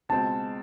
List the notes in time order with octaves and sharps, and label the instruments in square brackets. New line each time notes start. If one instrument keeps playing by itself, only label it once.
[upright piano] C#2 B2 G#3 C4 [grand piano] A5